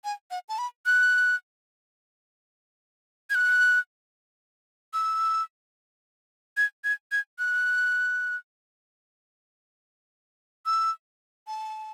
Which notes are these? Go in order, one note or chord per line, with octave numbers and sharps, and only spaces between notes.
G#5
F#5
A5
B5
F#6
G#6
F#6
E6
G#6
G#6
G#6
F#6
E6
A5